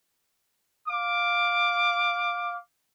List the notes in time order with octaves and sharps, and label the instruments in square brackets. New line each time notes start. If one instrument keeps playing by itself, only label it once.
[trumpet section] F5 D6